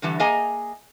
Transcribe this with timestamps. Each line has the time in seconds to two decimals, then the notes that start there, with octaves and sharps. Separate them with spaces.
0.02 G2 D3 E3 G3
0.20 A#3 G#4 D#5 G#5 A#5